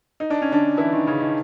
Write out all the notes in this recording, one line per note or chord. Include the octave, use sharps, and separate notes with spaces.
D#4
D4
C#4
D3 D4
E3 E4
D#3 D#4
C#3 C#4
D#3 D#4